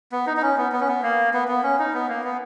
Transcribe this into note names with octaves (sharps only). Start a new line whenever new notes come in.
B3
D#4
D#4
C#4
B3
B3
C#4
B3
A#3
B3
B3
C#4
D#4
B3
A#3
B3